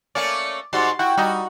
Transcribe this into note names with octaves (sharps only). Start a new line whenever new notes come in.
A3 A#3 C#4 D5 C#7
G#2 G3 F#4 C6 A6
E4 F#4 G5
G3 D#4 F#4